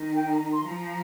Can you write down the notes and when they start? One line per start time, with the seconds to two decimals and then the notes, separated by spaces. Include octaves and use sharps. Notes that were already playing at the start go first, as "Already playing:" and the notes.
Already playing: D#3
0.14 G5
0.27 A#5
0.39 A#5
0.51 C6
0.63 F3 A#5